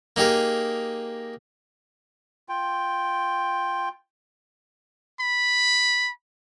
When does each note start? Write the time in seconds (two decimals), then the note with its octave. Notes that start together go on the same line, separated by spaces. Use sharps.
0.16 A#3 D#4 G4 G#4 A#4
2.49 F4 G5
5.20 B5